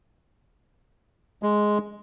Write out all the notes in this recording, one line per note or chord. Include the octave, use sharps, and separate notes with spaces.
G#3